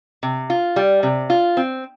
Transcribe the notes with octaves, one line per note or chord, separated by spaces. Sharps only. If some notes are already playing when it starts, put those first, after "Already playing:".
C3
F4
G3
C3
F4
C4